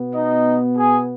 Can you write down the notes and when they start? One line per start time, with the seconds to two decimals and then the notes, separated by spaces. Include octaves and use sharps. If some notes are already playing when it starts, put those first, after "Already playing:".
Already playing: B2 B3
0.13 D#4 D#5
0.75 G#4 G#5